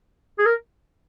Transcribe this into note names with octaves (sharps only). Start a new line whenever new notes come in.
G#4
A#4